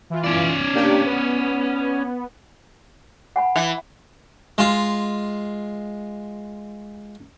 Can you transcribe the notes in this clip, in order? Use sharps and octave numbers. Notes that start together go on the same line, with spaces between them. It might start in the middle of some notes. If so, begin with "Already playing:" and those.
E3 F4
C#4 D5
A#3 D4 G4
B3
F#5 G#5 B5
E3
G#3 F4